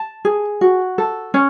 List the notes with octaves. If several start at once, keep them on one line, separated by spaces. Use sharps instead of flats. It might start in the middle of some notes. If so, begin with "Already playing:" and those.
Already playing: A5
G#4
F#4
A4
C#4